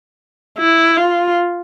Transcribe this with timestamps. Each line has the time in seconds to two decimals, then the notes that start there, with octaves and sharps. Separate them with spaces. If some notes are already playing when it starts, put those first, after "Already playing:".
0.58 E4
0.97 F4